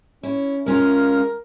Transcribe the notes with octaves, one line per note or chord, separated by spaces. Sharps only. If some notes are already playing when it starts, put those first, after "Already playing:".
C#4 E4
G#3 C#4 F4 A#4